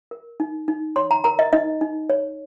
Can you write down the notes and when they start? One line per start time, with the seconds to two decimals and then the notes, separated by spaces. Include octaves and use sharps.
0.11 A#4
0.40 D#4
0.68 D#4
0.96 C#5 C6
1.11 A#5
1.24 A#4 A#5
1.39 D#5
1.53 D#4 D#5
1.81 D#4
2.10 C#5